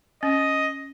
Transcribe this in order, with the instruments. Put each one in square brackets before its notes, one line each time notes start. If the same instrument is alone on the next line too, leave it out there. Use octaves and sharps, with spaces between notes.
[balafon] C#4 [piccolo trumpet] D#5